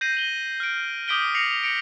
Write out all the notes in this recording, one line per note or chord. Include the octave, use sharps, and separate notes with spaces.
G6 A#6 C7 D#7 F#7
F#7 G7
F6 D7
D6 D#6 G6 B6 D7 G7
A#6 C7 C#7 F7
A#6 B6 C#7 D7